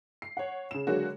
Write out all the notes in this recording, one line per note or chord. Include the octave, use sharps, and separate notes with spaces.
C7
C#5 F#5
C#3 E7
D3 F#3 G#3 A#3 F#4